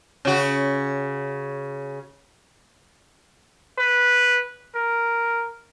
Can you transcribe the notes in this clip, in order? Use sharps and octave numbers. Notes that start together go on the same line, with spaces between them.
C#3 F#4
B4
A#4